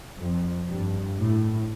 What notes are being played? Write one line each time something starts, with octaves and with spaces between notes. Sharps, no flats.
F2
G2
A2